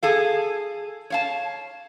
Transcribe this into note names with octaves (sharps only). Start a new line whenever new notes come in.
G#4 A4 F5
C#5 F5 A5